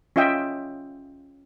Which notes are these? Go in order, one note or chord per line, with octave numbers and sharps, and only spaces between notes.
C#4 F4 D#5 E5 G5